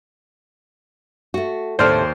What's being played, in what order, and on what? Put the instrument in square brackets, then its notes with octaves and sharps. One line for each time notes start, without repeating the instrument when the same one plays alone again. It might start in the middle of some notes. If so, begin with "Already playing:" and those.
[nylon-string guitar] A3 F#4
[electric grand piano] D#2 C6 F6 [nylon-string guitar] A2 C3 A4 [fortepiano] C5 D5